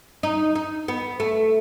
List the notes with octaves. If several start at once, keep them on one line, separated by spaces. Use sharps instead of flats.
D#4
D#4
B3
A3